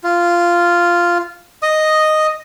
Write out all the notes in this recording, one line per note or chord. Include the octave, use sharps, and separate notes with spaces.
F4
D#5 D#6